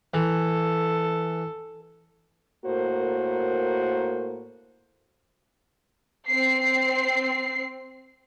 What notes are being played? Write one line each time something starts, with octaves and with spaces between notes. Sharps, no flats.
E3 A4
A2 A#3 F#4 A#4 C5
C4 C7